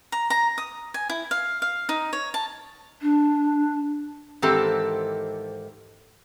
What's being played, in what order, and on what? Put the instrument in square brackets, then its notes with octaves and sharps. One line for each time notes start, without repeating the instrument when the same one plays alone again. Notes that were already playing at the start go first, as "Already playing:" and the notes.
[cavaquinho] A#5
A#5
D#6
G#5
E4
F5
F5
D#4
C#5
A5
[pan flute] D4
[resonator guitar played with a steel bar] G#2 D#3 E3 C4 G4 A4